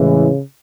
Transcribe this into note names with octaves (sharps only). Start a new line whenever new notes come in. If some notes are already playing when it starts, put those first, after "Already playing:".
Already playing: A2 C#3 E3 G#3